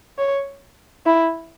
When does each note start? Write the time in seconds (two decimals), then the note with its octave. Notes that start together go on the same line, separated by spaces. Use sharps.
0.19 C#5
1.06 E4